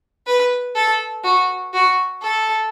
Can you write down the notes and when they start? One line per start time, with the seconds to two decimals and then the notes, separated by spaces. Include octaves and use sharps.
0.27 B4
0.75 A4
1.24 F#4
1.74 F#4
2.22 A4